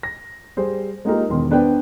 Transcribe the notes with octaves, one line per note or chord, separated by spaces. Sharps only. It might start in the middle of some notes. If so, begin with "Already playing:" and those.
A#6
G3 G#4 C5
G#3 A#3 D#4 F4 G4 A#4
E1 B2 D#3 C6
B3 D4 B4 C5 D5 G5